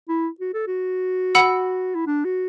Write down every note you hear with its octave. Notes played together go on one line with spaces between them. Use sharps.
E4
F#4
A4
F#4
F#5 B5 E6
E4
D4
F#4